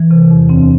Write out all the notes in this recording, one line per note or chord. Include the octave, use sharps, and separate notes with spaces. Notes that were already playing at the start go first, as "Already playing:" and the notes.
Already playing: E3
C3
E2
D2 C4